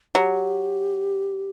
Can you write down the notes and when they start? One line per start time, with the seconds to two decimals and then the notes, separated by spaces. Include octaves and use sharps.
0.15 F#3 G4